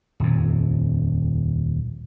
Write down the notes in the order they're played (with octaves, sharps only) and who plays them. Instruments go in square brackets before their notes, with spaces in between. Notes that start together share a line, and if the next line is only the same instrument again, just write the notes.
[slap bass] D#1 F2